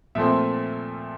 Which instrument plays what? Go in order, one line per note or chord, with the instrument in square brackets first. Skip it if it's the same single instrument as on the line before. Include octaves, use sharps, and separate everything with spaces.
[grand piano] A#2 F3 A3 C4 E5